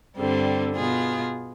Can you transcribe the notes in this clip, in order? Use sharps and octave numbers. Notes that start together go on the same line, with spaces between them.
G2 D3 G3 C4
B2 B3 F4 G#4